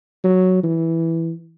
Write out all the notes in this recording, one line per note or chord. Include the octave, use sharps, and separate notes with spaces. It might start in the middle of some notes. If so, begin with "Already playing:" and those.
F#3
E3